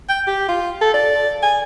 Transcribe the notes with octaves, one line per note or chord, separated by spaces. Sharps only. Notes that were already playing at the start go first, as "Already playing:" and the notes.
G5
G4
F4
A4
D5
G#5